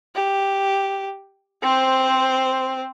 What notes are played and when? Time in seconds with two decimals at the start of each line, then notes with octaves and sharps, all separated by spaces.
0.15 G4
1.62 C4 C5